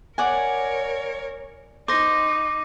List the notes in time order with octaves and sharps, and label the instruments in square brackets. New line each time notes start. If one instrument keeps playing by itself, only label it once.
[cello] A#4 C#5 [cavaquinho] D5 F#5 G#5
[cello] D#4 [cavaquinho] C5 [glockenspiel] D6 A#6